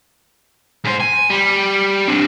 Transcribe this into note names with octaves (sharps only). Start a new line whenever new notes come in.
G#2 C5
G#5
G3
C4 D4